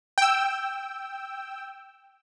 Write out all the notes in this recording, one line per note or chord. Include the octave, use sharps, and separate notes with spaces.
G5 E6